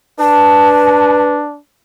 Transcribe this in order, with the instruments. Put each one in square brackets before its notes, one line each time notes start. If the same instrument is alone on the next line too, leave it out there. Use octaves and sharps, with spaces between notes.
[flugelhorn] D4 [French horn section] B4 [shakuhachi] A5